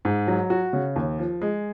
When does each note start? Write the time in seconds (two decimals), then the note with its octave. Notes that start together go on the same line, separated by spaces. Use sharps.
0.05 G#2
0.27 F#3
0.50 F#4
0.73 C#3
0.96 D#2
1.19 F3
1.42 G#3